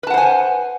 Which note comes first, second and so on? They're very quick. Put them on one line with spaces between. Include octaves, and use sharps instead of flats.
B4 A5 F#5 C5 G#5